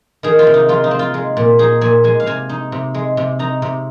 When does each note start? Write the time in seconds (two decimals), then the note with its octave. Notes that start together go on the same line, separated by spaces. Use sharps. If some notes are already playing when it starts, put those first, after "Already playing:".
0.23 D#3 G#4
0.39 F4
0.47 C3
0.54 D#4
0.69 G#3 F4
0.84 D#4
0.91 C4
0.99 F4
1.14 G#3
1.37 A#2
1.59 D#4 G#4
1.81 A#2 G#5
2.04 G#3 G#5
2.20 F5
2.26 C3 G#5
2.49 D#4
2.72 C3
2.94 G#3
3.17 C3
3.39 D#4 A#5
3.62 C3